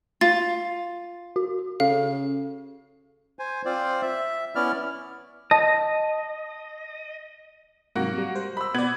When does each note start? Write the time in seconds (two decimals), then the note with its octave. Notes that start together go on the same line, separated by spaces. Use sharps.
0.21 F4 A6
1.36 F#4
1.80 C#3 A4 F5
3.39 C5 G#5
3.65 C4 F4 C5 D5
4.02 E5
4.55 B3 C#4 E4 D5 F6
5.51 D#5 A5
7.95 G#2 C3 F#3 A#3 F#4
8.18 G3
8.35 C5
8.57 B5 E6
8.74 B2 B3 D5 G#6 F#7